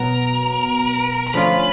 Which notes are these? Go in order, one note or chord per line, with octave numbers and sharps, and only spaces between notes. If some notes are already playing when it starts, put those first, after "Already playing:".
Already playing: B2 F#3 B3 A#4
A#4
D3 F3 A3 C#4 F4 B4